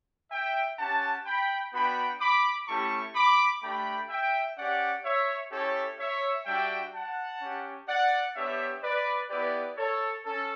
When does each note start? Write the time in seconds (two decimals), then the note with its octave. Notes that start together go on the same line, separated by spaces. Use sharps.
0.31 E5 G5
0.79 C#4 G4 F#5 A5
1.26 G5 B5
1.73 B3 D4 F#4 G5 B5
2.20 B5 D6
2.68 A3 C#4 E4 G4 A5 C#6
3.15 B5 D6
3.62 A3 D4 G4 G5 B5
4.10 E5 G5
4.57 C#4 G4 D5 F#5
5.04 C#5 E5
5.51 C#4 E4 G4 A4 C#5
5.99 C#5 E5
6.46 G3 D4 F#4 E5 G5
6.93 F#5 A5
7.41 C#4 G4
7.88 D5 F#5
8.36 B3 D4 G4 C#5 E5
8.83 B4 D5
9.30 B3 E4 G4 B4 D5
9.77 A4 C#5
10.25 C#4 A4